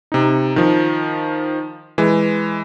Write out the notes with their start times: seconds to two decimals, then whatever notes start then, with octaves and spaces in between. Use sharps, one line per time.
0.12 C3 D#4
0.56 D#3 F3
1.98 E3 G#3